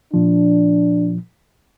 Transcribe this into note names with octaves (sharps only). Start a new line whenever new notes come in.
A#2 F3 D4